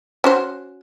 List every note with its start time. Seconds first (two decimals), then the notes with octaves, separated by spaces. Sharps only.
0.24 C#4 F#4 C5